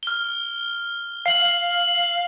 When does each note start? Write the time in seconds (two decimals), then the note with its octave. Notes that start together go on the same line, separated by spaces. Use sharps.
0.03 F6 G7
1.26 F5 C7 F#7